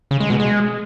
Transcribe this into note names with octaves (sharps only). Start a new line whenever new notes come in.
C#3
G#3
B2
G#3